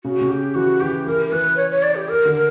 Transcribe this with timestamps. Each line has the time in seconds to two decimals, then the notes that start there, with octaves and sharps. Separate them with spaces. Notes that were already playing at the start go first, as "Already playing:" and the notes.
0.04 C#3 F#4
0.21 C#3
0.30 G4
0.55 E3 F#4
0.81 E3 G4
1.06 E3 A#4
1.26 A#4
1.32 E3 B4
1.57 C#5
1.71 C#5
1.83 D5
1.95 G4
2.09 A#4
2.25 D3
2.35 A#4